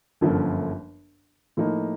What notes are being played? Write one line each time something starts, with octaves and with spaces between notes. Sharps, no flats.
G1 F#2 D3 F3 A#3
A2 F3 A#3 D#4